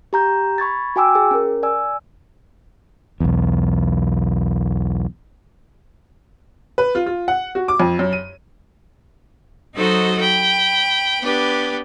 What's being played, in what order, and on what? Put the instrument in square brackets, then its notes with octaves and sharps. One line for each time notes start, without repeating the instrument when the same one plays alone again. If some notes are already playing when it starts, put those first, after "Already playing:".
[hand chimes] G4 A#5 G6
B5 C#6 G#6 A6
F#4 G5 G#5 D6 E6
G#4
C#4 A#4
D5 G#5 E6
[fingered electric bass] B1 E2
[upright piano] B4
F4
F4
F#5
F#4
D6
F2
F#2
D#7
[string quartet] F#3 D#4 F#4 A4 C5 D#5
G5 B5
B3 D4 G4 B4